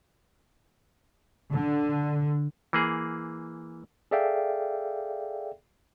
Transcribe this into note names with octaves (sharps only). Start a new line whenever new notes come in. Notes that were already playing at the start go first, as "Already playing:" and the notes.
D3
E3 A#3 G#4
G#4 A4 D5 E5 F5 G5